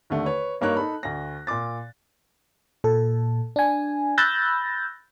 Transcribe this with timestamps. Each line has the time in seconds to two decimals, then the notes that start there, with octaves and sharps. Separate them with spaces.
0.10 D#2 D3 A3
0.26 B4 C#5
0.61 G2 A#3 D#4 A#4 C#5 F#6
0.77 D#4 A4 B5
1.03 D2 A#6
1.47 A#2 C6 D6 A6
2.84 A#2 A4
3.56 D4 G#5
4.18 B5 E6 F#6 G6 A6 A#6